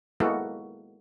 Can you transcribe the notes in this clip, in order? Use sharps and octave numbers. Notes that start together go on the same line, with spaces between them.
G#3 A#3 B3 E4 F#4 A4